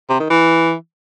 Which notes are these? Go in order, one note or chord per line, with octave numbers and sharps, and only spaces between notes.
C3
D#3
E3